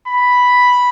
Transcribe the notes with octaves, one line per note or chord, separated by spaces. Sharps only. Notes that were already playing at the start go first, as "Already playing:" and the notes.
B5